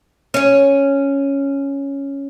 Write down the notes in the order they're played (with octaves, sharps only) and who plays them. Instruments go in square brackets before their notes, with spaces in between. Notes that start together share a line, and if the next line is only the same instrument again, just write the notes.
[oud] C#4 C#5